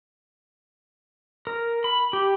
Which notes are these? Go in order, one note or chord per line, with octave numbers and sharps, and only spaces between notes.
A#4
B5
G4